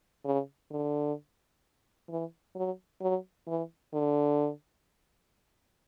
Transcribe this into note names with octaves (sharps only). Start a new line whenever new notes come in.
C#3
D3
E3
F#3
F#3
E3
D3